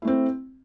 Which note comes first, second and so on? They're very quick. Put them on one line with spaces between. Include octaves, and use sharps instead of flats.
E4 A3 C4